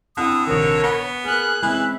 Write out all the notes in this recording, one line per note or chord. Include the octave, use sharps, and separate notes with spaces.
D3 C4 E4 G5 D#6
A#1 C3 D#3 A#4 C#5
B3 G#5
A#3 G#4 A#4 F6 F#6
E3 G#3 C4 C#4 E5